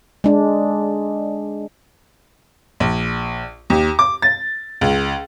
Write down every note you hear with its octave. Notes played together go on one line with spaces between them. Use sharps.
G#3 D4
A#1
D#2
D6
A6
C#2